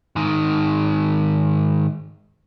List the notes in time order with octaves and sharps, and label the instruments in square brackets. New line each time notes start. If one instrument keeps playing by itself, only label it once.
[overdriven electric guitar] G#2 D#3